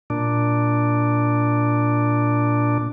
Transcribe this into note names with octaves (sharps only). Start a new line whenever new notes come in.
A#2 D4